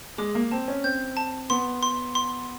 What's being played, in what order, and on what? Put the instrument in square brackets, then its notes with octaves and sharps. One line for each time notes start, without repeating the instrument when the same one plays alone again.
[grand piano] G#3 [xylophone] D6
[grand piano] A#3
[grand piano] C4 [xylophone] A5
[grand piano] C#4
[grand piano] C4 [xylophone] G6
[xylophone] A5
[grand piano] B3 [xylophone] C6
[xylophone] C6
C6